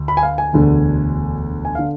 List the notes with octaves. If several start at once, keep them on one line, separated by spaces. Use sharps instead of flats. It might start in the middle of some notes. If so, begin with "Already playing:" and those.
Already playing: D2
B5
G#5
F5
G#5
E1 D2 D3 A3
G#5
D3 F5